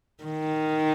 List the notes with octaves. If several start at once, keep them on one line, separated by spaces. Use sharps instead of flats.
D#3